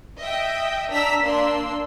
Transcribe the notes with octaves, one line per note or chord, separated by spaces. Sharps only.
D#5 E5 G5
D4 A#5 E6 B6
A#3 D4 C6 E6